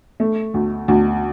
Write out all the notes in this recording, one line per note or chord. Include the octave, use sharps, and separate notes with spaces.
A3
D2
D2